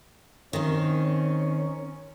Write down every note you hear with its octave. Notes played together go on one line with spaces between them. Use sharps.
D#3 C4 C#4